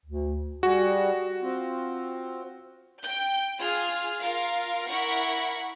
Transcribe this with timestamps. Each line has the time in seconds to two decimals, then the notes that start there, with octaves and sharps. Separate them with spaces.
0.06 D2
0.63 G3 F#4 G#4
1.42 C4 F4
3.02 G5 G6
3.59 F4 G#4 F6
4.21 F4 A#4 F5
4.89 E4 A#4 F#5 C#6